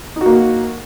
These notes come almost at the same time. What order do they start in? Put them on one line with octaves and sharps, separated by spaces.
D#4 F#4 A#3